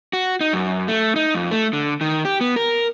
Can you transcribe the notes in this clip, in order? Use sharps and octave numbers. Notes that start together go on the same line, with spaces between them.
F#4
D#4
F#2
A3
D#4
F2
A3
D3
D#3
G4
B3
A#4